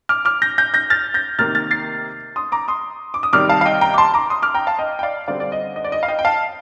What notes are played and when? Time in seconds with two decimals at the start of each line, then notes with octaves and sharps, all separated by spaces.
0.09 D6 F6
0.25 D6 F6
0.42 G6 A#6
0.58 G6 A#6
0.74 G6 A#6
0.90 F6 A6
1.14 G6 A#6
1.39 C3 D#3 A#3 F6 A6
1.55 F6 A6
1.71 A6 C7
2.36 C6 D#6
2.52 A#5 D6
2.68 C6 D#6
3.14 D6
3.23 D#6
3.33 C3 D#3 G3 D6 F6
3.49 F5 A5
3.61 F5
3.65 D#5 G5
3.81 G5 A#5
3.94 D6
3.98 A5 C6
4.14 A#5 D6
4.30 C6 D#6
4.42 D6 F6
4.54 G5 A#5
4.67 F5 A5
4.79 D#5 G5
4.99 G5
5.03 D5 F5
5.28 D3 G3 C4 D5 F5
5.40 D5
5.52 D#5
5.76 D#5
5.84 D5
5.92 D#5
6.03 F5
6.08 D#5 G5
6.19 G5
6.25 F5 A5